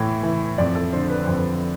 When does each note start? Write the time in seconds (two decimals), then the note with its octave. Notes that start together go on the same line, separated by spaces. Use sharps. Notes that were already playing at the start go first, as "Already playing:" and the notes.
Already playing: A2 E3
0.23 E3
0.58 F2 D5
0.75 A4
0.93 D3 C5
1.10 B4
1.24 F2 C5
1.37 B4